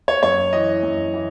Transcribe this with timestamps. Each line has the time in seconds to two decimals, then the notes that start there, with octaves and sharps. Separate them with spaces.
0.08 C#5
0.23 F#2 C#5
0.53 E3 D#5
0.83 F#2
1.14 E3